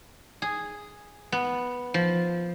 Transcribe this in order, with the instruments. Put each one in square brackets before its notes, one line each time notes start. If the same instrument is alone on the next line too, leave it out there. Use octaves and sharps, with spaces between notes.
[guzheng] G#4
B3
F3